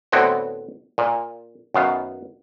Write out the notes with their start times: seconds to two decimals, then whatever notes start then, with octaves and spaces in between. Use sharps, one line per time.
0.12 A2 D3 B3 C4 E4 F#4
0.98 A#2
1.74 F#2 D#3 B3 F5